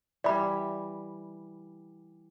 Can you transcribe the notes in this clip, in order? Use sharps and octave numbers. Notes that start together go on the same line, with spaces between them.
E3 G3 D5 B5